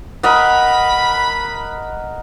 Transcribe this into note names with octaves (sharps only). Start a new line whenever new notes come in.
A#4 D#5 F#5 B5